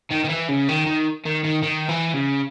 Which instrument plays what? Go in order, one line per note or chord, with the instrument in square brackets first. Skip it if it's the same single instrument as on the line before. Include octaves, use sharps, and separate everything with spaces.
[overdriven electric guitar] D#3
D#3
E3
C#3
D#3
D#3
D#3
D#3
D#3
E3
C#3